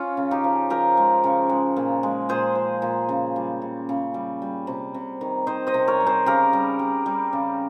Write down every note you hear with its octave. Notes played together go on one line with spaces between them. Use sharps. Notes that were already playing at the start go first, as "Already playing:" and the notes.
Already playing: C#4 F4
C#3
D#4 G4
F3
F3 G4 A#4
G#3
C#3
G#3
A#2
G#3
A#2 G#4 C5
F3
A#2
C#3
G3
C#3
C#3
G3
G3
C3
C3
D#3
D#3 C5 D#5
C5 D#5
C3
A#4 C#5
G3
G#4 C5
C#3 G4 A#4
G3
G3
G3
C#3